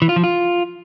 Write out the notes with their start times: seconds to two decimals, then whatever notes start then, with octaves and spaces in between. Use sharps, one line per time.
0.02 E3
0.09 F4
0.16 F3
0.24 F4